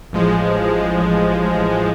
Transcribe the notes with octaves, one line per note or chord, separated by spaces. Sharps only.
A1 F3 G#3